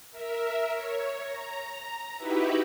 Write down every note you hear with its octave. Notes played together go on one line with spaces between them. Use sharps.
A#4 E5
C#5
A#5
D#4 E4 F#4 G4 B4 E5